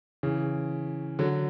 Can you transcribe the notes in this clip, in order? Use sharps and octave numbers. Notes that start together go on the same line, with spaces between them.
C#3 E3
D3 F#3